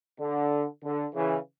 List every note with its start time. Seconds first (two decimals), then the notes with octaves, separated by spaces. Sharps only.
0.20 D3
0.83 D3
1.14 C#3 E3